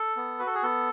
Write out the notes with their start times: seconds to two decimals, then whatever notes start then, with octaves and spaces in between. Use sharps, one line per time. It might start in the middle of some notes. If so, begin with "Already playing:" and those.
Already playing: A4
0.16 B3
0.39 F#4 B4
0.47 A4
0.55 G#4
0.63 B3 A4